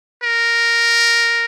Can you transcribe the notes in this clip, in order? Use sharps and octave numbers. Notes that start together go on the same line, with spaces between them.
A#4